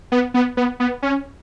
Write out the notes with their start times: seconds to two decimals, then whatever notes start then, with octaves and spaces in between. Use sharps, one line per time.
0.12 B3
0.34 B3
0.57 B3
0.80 B3
1.02 C#4